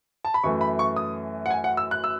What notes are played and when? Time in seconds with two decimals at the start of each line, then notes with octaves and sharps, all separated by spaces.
0.25 A5
0.34 B5
0.44 F#2 E3 A3 C#6
0.61 B5
0.79 C#6
0.96 D#6
1.46 F#5
1.51 G#5
1.64 F#5
1.77 E6
1.91 F#6
2.04 E6